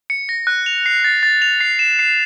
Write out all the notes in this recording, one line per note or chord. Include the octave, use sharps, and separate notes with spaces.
C#7
A#6
F#6
F7
C7
A6
A6
F7
C7
E7
C7